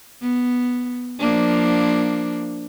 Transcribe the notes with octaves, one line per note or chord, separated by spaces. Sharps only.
B3
F3 A#3 D4